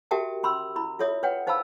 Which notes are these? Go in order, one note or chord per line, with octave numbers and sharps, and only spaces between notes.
F#4 G4 A#4 E5 G5 A5
C#4 B5 C6 E6
E4 B5
F4 A4 C#5 E5 D#6
B4 C#5 F#5 G5
D#4 C5 F5 A5 B5 E6